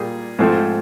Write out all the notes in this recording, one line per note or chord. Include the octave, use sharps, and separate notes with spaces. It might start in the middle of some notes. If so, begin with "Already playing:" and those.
Already playing: A#2 G3 A#3 G#4
G#2 F3 A3 C4